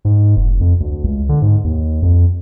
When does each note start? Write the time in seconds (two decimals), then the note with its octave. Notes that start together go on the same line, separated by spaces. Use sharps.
0.05 G#2
0.36 F1
0.61 F2
0.80 D2
1.04 C#2
1.29 D3
1.42 G#2
1.64 D#2
2.02 F2